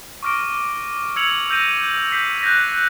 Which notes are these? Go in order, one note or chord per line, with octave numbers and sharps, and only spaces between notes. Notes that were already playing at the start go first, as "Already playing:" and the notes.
C#6 D6 F6 A#6 D7
E6 G#6 C#7 F7 F#7
E6 G6 A#6 D#7
G6 B6 C7
F#6 G6 A#6 B6